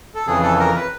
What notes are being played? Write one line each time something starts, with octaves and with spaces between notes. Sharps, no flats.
A4
F2 C#3 E3 G#4
A4
A#4
B4